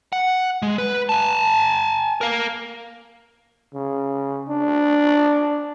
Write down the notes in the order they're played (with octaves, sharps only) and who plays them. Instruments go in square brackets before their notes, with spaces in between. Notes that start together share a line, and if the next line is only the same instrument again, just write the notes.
[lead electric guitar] F#5
G#3
B4
G#5 A5
A#4 F5
[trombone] C#3
D4